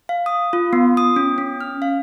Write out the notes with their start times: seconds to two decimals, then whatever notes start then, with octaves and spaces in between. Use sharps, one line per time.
0.09 F5
0.26 D#6
0.53 F4
0.73 B3
0.97 D#6
1.16 C#4
1.38 C#4
1.61 F6
1.82 F5